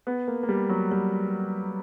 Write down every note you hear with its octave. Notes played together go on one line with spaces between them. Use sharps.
B3
A#3
A#3
G3
F#3
G3